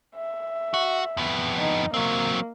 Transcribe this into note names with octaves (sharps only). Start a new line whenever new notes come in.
E5
F#4
F2 B3
D#4
F#3 A#3 C4